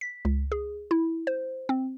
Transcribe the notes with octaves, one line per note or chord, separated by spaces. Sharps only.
B6
C#2
G#4
E4
C5
C4